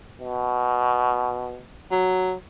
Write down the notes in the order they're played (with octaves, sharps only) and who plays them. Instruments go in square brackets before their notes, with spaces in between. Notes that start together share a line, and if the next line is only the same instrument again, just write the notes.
[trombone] B2
[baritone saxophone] F#3